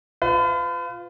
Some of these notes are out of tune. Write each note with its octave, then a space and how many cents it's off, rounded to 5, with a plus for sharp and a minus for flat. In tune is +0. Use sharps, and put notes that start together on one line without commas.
F4 +0 B4 +40